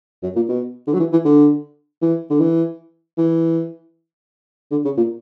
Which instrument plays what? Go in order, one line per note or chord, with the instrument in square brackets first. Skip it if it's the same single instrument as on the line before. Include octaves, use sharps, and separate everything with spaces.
[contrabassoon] F#2
A#2
B2
D3
F#3
E3
E3
D3
E3
D3
E3
E3
D3
C#3
A#2